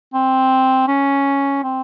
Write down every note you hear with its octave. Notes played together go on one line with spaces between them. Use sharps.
C4
C#4
C4